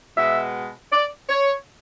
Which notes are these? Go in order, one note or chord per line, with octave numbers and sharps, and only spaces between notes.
B2 G#3 B3 E5
D5
C#5